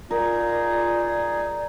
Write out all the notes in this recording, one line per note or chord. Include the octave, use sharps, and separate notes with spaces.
D#4 F4 G#4 A#4 D5